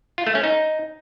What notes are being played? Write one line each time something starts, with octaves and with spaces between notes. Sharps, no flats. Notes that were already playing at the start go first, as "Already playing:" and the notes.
F4
A3
C#4
D#4